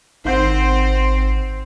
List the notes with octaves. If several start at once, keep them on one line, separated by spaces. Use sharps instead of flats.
G#1 D#3 C4 C5 F#5 G6